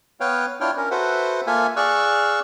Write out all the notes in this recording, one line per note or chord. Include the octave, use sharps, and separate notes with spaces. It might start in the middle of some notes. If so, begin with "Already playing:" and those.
B3 B4 C#5 F5 G5
D4 E4 F4 C#5 G5 F6
C#4 A#4
F#4 A4 B4 C5 E5 F#5
A#3 F4 A4 E5 F5 G#5
G#4 D5 F5 C#6 E6 F#6